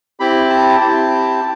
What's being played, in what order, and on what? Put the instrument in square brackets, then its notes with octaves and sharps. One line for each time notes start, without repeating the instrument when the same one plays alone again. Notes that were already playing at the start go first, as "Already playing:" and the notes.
[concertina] C4 E4 G4 B5
A5
C4 E4 G4